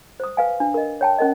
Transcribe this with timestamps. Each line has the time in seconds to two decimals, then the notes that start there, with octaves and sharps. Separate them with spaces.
0.20 C5 D#6
0.37 B4 F5 G#5
0.60 D4
0.74 A#4 D#5
1.01 C#5 G5 A5
1.18 C#4 A#4 D#5